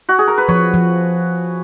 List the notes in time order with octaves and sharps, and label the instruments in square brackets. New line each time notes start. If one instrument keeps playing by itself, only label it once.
[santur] F#4
G#4
A#4
B4
[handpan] F3 [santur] C#5
[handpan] F3